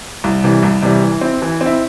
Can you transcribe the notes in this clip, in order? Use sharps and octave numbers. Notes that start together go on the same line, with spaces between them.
C2
C3 E3 G3
C2
C3 E3 G3
E3
C4 E4
E3
C4
E4